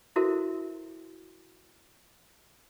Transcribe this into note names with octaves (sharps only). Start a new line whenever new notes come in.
E4 F#4 A4 A#4 C5 E5